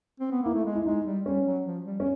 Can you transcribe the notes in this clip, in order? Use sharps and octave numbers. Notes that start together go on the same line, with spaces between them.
C4
B3
A#3 E4
A3
G#3
E4
G#3 D#4
G3
G3 C#4
F#3
F3
G3
C#4